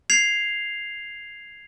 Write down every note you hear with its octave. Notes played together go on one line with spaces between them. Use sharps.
G#6 C7 F7